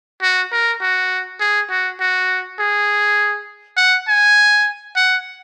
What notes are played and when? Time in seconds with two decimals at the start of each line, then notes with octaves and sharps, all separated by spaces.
0.22 F#4
0.52 A#4
0.81 F#4
1.40 G#4
1.70 F#4
2.00 F#4
2.59 G#4
3.77 F#5
4.08 G#5
4.96 F#5